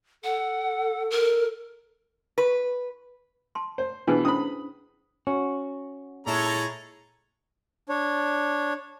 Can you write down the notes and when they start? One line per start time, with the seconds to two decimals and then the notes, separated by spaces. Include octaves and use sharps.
0.24 A4 F#5
1.10 A#4
2.38 B4
3.55 A5 C6
3.78 C5
4.07 B2 E3 D4 G#4 B4
4.25 C#4 E4 C5 B5 D#6
5.27 C#4 F#4
6.27 A#2 G#3 E4 A4 C#5 A5 A#5
7.89 D4 C#5